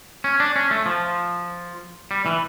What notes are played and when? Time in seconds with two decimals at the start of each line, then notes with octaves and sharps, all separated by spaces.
0.24 C#4
0.40 D4
0.56 C#4
0.71 A3
0.86 F3
2.11 G3
2.26 E3